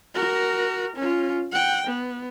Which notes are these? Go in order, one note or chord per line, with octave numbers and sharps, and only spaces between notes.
F#4 A#4
C#4 F4
F#5 G5
B3